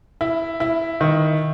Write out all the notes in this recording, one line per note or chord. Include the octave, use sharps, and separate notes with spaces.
E4
E4
D#3